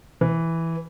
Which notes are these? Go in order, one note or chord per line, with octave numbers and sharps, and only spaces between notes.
E3